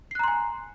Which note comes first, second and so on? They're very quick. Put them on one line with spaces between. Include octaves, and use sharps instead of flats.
C7 F#6 A#5 C6 G#5